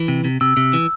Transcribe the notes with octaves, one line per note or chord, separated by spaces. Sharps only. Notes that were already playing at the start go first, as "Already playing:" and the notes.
Already playing: E3
C3
C3
C3 E6
C3
E3